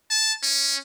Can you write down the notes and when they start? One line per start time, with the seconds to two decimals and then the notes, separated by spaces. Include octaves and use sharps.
0.11 A5
0.43 C#4